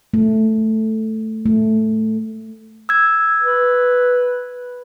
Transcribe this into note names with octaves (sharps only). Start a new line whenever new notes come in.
A3
A3
E6 G#6
B4